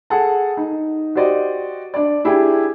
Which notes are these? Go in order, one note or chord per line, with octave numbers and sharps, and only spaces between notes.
G#4 A4 F#5 A5
D#4
F#4 G4 C5 D5 D#5
D4 D5
D4 E4 G4 G#4